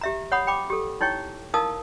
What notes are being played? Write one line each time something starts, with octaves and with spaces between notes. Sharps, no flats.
G4 E5 A#5
C#5 F#5 B5 D#6
G5 B5 D6
G4 A4
D#4 E4 C#5 G5 C#6
D#4 E4 A#4 F5 A5 D#6